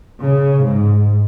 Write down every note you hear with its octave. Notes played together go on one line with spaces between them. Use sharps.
C#3
G#2